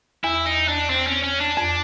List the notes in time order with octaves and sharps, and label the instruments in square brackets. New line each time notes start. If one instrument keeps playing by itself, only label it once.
[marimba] E2 [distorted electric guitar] E4
[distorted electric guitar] D#4
D4
C4
C#4
C#4
D4
[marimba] F2